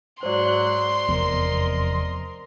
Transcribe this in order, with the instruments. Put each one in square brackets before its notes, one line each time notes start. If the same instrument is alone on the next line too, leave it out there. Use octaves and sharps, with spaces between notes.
[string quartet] G#2 F#3 F#6 [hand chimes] C5 D5 [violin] C6
[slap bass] F1 E2 B3 [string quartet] A#4 D#5